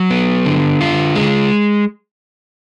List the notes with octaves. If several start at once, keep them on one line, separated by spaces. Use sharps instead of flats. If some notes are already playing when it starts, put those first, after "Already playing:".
Already playing: F#3
B3
D3
F4
G#3